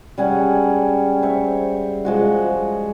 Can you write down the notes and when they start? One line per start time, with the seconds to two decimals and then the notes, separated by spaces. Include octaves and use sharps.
0.18 G3 C#4 G#4 F#5
0.64 C#5
1.22 C5 E5 C#6
2.05 F3 G#3 F#4